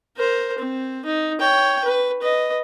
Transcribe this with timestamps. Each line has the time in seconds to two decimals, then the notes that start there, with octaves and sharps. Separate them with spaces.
0.17 A#4 C5
0.59 C4
1.06 D#4
1.40 C#5 G5
1.85 B4
2.22 B4 D#5